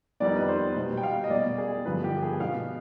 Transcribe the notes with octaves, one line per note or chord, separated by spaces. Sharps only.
F2 D#3 G3 B3 D5
B4
C5
B2 G3 B3
G5
F5
D#5
B2 G3 B3 D5
G#4
G2 D3 F3 B3 B4
G4
G#4
B2 G#3 B3 F5